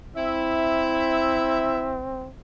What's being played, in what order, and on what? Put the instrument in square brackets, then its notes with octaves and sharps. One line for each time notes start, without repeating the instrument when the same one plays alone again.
[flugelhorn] C4 [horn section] E4 E5